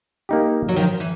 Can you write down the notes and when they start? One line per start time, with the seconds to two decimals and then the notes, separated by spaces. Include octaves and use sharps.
0.29 A#3 D#4 G4
0.69 F#3
0.76 D#3 F3
1.00 E3